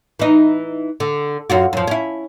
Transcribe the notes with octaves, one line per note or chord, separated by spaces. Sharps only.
E3 D#4
D3
F#2 F4 F#4
F#2 F3
C#4 E4